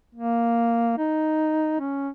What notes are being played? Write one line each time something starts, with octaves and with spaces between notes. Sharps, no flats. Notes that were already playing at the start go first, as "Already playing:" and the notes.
A#3
D#4
C#4